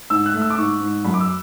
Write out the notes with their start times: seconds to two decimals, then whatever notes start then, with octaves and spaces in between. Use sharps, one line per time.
0.10 G#2 E6
0.26 F#6
0.34 A3
0.41 E6
0.50 D6
0.57 G#2 C#6
0.81 G#2
1.04 F#2 B5
1.14 D6
1.21 E6